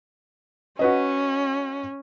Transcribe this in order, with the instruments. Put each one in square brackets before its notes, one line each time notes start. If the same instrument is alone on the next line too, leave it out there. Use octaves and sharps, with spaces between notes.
[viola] C#4 [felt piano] F#4 B4 D#5